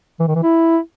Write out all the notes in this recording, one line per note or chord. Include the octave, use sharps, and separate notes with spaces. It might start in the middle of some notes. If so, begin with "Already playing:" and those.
E3
D#3
E3
E4